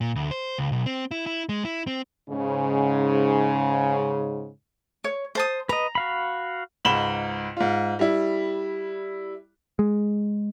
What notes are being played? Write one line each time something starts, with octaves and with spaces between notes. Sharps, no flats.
A#2
D2
C5
C#2
B1
C4
E4
E4
G#3
E4
C4
G#2 C#3
C#5
C5 A5 D#6
B4 D#5 A#5
F#4 F5 B5
C#2 G#2 B5 E7 F#7 G7
G#2 F4
G3 E4
G#3